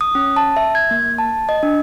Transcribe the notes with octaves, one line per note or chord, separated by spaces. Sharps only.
D#6
C#4
A5
E5
G#6
A#3
A5
D#5
D4